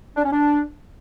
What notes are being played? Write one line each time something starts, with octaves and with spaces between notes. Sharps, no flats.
D4
C#4
D4